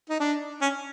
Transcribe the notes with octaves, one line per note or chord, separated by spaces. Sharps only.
D#4
D4
C#4